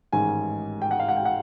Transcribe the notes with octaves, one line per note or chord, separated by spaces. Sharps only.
A1 G#2 D#3 G#3 G#5
G5
F#5
F5
F#5
G5
F#5